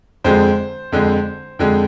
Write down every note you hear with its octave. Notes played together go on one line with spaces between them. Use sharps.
F2 D3 G#3 C5
F2 D3 G#3
F2 D3 G#3